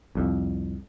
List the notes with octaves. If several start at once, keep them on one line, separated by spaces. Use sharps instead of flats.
C2 F2